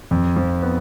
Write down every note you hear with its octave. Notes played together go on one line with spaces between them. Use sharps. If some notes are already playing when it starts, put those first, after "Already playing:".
F2
F3
B3